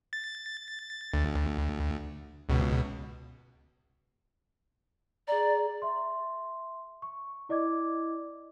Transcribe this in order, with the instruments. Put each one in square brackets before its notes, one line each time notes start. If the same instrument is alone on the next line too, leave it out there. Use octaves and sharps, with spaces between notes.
[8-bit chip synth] A6
D2
C#2 B2
[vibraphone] G#4 A#5 [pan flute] D5
[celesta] E5 C6
C#6
E4 D5 D#5 D6 G#6